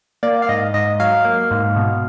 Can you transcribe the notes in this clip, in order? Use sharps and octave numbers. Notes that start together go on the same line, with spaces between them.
A#3 D5
F5
G#2 D#5
G#2 D#5
F#3 F5
A#3
G#2
B2